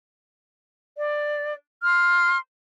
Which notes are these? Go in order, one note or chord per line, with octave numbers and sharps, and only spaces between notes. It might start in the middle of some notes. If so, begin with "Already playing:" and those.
D5
C6 F6